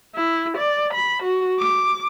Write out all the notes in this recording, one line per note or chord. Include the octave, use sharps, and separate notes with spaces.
E4
D5
B5
F#4
D6